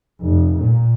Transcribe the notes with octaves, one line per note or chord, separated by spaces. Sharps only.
F1
A#2